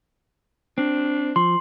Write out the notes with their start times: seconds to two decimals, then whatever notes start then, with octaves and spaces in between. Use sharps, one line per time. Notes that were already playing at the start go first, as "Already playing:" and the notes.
0.78 C4 D4
1.36 F3 C6